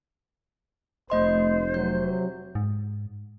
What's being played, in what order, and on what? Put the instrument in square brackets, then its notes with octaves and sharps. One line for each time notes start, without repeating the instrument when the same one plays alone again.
[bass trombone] F1 [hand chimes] A3 D#5 C6 [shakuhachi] C5
[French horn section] C3 F#3 [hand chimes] G6
[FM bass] G#2